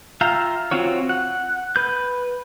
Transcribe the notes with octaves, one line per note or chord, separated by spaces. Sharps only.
F4 E5 F5 G5 A#5
C4 F4 F#4 C#5
F#5
B4 G6